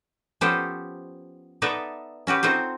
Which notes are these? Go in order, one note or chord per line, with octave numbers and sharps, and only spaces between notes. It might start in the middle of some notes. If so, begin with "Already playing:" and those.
F3 B3 C#4 G4 A4 C5
B3 D#4 A4 B4 D5 E5
C#4 F#4 G4 B4
C4 D#4 F4 F#4 A4 C5